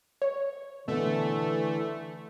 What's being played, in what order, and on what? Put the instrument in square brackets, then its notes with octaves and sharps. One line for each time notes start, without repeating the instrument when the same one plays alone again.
[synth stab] C#5
[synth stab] B2 [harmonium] D3 E3 [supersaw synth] A3